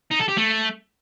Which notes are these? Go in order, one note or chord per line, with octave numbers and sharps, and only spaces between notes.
D#4
A4
G4
A3